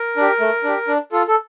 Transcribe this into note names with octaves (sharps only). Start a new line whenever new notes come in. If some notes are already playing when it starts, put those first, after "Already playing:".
Already playing: A#4
D4 G4
A3
D4 G4
D4
F4 A4
A4